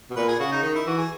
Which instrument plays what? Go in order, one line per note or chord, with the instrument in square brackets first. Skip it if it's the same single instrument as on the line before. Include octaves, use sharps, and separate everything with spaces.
[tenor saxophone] B2
[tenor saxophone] A#2 [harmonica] B4
[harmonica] G#4
[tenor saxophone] C#3 [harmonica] F#4
[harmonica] D#4
[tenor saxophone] D#3 [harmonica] D#4
[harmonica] E4
[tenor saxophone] E3 [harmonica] F#4
[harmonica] G#4